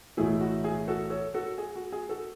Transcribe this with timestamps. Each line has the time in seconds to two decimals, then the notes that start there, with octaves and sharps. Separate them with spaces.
0.17 B1 A2 E3 A3 E4 G#4
0.41 F#4
0.64 G#4
0.88 F#4 A4
1.10 A4 C#5
1.34 F#4 A4
1.58 G#4
1.76 F#4
1.92 G#4
2.09 F#4 A4